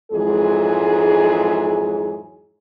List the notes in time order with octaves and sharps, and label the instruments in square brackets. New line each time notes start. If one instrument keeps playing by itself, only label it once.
[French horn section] F2 G#2 E3 F#3 G#3 G#4